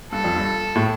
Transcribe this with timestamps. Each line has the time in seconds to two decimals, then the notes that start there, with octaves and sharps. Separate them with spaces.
0.12 G2 A4
0.24 F2
0.36 G2
0.76 A2